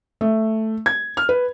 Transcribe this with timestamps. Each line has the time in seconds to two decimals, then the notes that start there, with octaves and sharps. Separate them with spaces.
0.21 A3
0.86 G#6
1.17 F6
1.29 B4